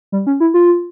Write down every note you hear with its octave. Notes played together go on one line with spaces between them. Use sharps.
G3
C#4
E4
F4